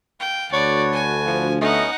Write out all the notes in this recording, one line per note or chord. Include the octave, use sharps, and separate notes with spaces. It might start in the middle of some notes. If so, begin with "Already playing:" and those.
F5 G5
D2 F#4 B4 C#5 D5 A5
G#5
F3
A3 B3 C#4 D#4 D#5 F#5